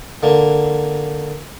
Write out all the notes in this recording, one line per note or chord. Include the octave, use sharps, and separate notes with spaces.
D3 A#3